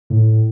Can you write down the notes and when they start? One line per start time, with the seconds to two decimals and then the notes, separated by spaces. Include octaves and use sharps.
0.10 A2